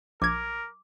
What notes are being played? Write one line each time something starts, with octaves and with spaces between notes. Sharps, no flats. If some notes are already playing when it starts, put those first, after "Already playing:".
A#1 A#4 D6 G#6